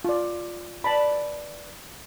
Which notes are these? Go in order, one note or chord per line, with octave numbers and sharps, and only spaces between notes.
F4 D5
B4 D5 A5 B5